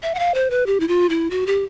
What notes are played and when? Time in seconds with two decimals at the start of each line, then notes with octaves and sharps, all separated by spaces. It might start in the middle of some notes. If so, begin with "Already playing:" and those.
0.03 E5
0.15 F#5
0.19 F5
0.34 C5
0.50 B4
0.66 G4
0.80 E4
0.88 F4
1.09 E4
1.30 F#4
1.47 G4